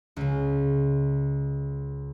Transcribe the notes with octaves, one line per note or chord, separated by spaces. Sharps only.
C#2 C#3